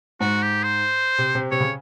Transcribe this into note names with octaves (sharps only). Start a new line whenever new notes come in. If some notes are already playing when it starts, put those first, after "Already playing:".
G#2 F#4
G4
C5
C3
C3
C3 C#5
C#3